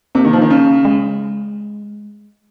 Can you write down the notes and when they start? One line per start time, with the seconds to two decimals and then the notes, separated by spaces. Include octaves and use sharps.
0.15 C3 A#3
0.25 D#3
0.33 F3
0.41 D#3
0.50 C#3
0.85 G#3